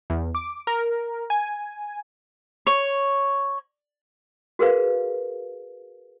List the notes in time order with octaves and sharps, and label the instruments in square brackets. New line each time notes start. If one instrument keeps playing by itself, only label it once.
[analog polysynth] E2
D6
A#4
G#5
[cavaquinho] C#5
[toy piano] F#4 G#4 A#4 B4 F5